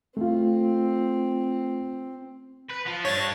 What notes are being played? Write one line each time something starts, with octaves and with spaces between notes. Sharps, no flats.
A3 C4 F4
B4
F3 F4
G2 D4 C#5 A6